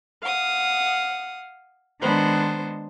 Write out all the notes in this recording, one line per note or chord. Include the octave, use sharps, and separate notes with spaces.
F5 F#5 D#6
D#3 G#3 B3 D4 C5